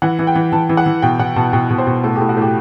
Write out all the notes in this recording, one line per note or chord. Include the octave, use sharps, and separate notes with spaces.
E3 F#5
E3
G5
E3
E3 A5
E3
F#5
E3
B2 G5
B2 F#5
B2 A5
B2 G5
B2
C5
B2
A2 A4
A2 G4
F#4
A2 G4